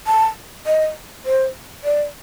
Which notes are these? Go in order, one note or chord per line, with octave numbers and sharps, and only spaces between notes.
A5
D#5
C5
D5